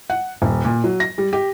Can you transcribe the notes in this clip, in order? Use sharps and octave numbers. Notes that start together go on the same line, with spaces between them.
F#5
D#1
A#2
F#3
A#6
G3
G4